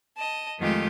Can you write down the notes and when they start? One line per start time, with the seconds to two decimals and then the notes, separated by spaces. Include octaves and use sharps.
0.17 D#5 A5
0.59 F2 D#3 G#3 A3 F4 G4